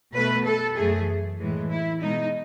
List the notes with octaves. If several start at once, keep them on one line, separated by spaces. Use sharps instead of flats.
B2 A3 B4
A4
F#2 E3 A3 G#4
A2 E3 G#3
E4
B2 G#3 D#4